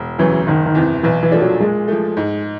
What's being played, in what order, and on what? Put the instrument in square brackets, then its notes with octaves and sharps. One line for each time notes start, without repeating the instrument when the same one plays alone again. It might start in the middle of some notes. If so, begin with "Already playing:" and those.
Already playing: [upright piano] E1
[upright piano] D2 C#3 F#3 [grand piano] E3
[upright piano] F#1 [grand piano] D#3
[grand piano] D#3
[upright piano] E2 C3 E3
[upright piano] B1 [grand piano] E3
[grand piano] E3
[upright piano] A#2 F3 A3 D4
[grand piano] F#3
[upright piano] A#2 [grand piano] G#3
[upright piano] F3 A3
G#2